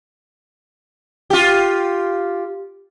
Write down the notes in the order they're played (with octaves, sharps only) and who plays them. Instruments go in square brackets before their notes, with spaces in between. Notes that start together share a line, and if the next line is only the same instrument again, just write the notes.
[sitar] F4 G4